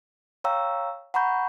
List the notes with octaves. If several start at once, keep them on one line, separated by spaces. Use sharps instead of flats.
C#5 F5 G5 A#5 C#6 E6
F#5 A#5 B5 C#6 G6